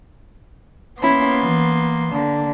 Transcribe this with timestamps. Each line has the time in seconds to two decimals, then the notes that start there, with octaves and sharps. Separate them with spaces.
1.01 A#3 B3 C#4 E4 C6
1.41 E3
2.13 D3 A#3